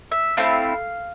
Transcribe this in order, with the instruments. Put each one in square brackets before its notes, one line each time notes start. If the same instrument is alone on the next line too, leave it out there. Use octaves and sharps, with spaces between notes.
[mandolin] E5
A3 C4 E4 F5